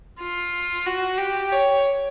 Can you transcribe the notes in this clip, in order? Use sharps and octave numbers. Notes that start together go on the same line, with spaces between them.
F4
F#4
G4
C#5